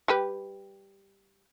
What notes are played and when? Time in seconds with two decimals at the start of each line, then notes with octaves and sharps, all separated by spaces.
0.08 G3 G4 B4